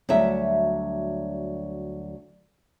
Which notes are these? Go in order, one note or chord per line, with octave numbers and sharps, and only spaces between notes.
D2 F#3 G3 E5